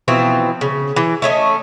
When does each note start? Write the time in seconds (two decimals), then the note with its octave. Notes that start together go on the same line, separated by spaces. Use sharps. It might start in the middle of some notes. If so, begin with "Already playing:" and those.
0.08 B2 E3 F3 C4
0.61 C#3
0.96 E3
1.22 A3 C#4 D#5